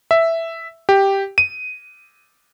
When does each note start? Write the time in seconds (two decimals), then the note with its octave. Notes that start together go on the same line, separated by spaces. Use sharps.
0.11 E5
0.89 G4
1.38 D#7